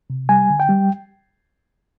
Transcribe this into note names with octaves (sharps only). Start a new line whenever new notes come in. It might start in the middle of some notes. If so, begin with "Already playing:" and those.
C3
G3 G#5
D3
G5
G3